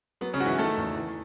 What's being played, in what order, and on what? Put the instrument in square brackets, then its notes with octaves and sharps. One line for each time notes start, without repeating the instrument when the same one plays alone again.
[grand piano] F#3 B3
C#3 C#4
G#2 F#4
E3 E4
D#3 A3 A4
E2
E3